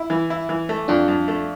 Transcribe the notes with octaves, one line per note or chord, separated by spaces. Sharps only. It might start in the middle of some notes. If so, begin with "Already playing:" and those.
Already playing: E4
E3
E4
E3
A3
F2 D4 F4
F2
A3